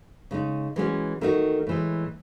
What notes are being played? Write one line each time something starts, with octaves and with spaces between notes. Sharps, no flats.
C#3 G#3 D#4
E3 G#3 C#4 F#4
D#3 A3 D#4 F#4
A2 E3 G#3